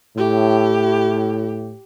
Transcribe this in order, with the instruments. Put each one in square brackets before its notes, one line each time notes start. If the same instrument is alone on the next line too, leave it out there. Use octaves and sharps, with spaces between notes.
[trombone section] A2 [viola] G4